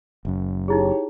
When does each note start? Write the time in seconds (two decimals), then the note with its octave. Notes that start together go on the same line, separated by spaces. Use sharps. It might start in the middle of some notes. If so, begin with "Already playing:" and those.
0.25 F#1 F#2
0.68 D#4 E4 G4 G#4 C#5